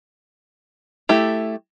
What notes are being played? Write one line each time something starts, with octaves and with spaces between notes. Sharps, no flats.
A3 E4 G4